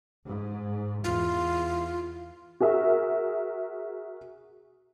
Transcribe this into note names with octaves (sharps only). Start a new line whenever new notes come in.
G#2
E2 F4
F#4 G#4 A#4 E5